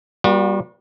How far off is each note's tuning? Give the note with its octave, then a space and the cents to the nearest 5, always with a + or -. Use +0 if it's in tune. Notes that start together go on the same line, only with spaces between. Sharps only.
G3 +0 A#3 +45 F#4 -40